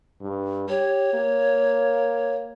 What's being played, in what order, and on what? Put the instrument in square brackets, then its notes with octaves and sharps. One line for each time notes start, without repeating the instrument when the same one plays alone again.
[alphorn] G2
[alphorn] G4 [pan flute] C#5
[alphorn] A#3